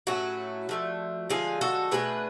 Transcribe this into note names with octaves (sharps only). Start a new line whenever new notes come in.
A2 F#3 A3 C#4 F#4
F3 A3 D4
D3 F3 G#3 F4 G#4
F#4 A4
B2 A3 D4 G#4 B4